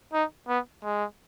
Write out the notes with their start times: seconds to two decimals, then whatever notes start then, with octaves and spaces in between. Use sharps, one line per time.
0.13 D#4
0.48 B3
0.83 G#3